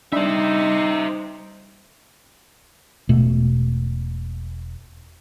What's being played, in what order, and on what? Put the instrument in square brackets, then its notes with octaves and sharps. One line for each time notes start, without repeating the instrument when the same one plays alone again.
[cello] G3 [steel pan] D4 B5 [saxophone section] D#4 [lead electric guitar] C5 E5
[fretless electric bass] E1 B2 A3